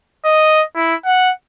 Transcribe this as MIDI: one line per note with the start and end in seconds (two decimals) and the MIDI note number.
0.25 0.63 75
0.75 0.95 64
1.05 1.30 78